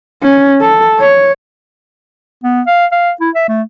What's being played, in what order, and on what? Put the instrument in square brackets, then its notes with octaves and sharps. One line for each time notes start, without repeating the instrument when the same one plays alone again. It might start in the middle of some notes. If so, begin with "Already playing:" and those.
[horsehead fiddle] C#4
A4
C#5
[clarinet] B3
F5
F5
E4
E5
A3